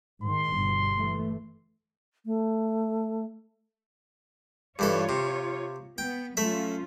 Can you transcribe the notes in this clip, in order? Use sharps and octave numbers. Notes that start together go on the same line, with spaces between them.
G#2 D#3 C6
G1 B2
E3 A3
A3
G2 E3 F4 A4 C#5
C3
B3 G5
F#3 A3 C#4 F4 E5